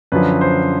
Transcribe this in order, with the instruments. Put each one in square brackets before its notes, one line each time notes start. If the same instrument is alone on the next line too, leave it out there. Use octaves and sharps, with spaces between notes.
[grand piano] F#2 D3 F3 B4
C5